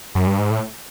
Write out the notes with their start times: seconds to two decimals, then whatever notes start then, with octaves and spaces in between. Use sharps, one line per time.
0.15 F#2
0.27 G2
0.39 G#2
0.51 A2